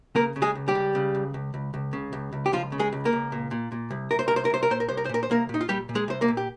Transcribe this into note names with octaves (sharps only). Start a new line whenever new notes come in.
C#3 A#3 A#4
C#3
G#3 G#4
C#2
G3 G4
C#2
C#3
C#2
C#2
C#2
C#2
C#3
C#2
C#2
G4
C#2 F3 F4
C#3
G#3 G#4
C#2
A#3 A#4
C#2
A#2
A#2
A#2
C2
C2 A#4
C5
C2 A#4
C5
A#4
C2 C5
A#4
A#2 C5
A#4
C2 C5
A#4
C5
A#2 A#4
C5
C2 A#3 A#4
A#2
D#4
F4
A#2 G3 G4
A#2
G#3 G#4
C2 C5
A#3 A#4
A#2
G4